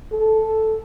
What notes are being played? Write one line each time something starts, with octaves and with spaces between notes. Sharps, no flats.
A4